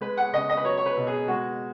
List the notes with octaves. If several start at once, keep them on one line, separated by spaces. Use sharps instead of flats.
G#3 B4
F#5
C#3 D#5
D#5
B4
F#3 C#5
C#5
B4
B2
G#4
G#3 F#4